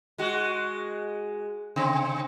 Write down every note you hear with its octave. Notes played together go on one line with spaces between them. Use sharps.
G#3 F#4
C3 C4